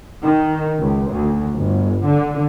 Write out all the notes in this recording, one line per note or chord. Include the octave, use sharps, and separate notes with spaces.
D#3
C#2
D2
G1
D3